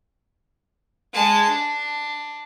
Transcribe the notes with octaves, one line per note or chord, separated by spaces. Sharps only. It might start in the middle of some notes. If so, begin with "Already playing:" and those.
G#3 A5
D4